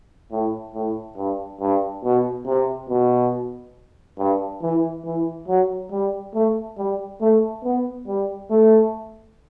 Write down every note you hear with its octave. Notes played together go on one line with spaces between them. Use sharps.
A2
A2
G2
G2
B2
C3
B2
G2
E3
E3
F#3
G3
A3
G3
A3
B3
G3
A3